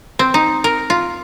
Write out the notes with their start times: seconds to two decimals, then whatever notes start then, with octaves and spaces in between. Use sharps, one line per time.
0.19 C4
0.34 D#4
0.64 A#4
0.90 F4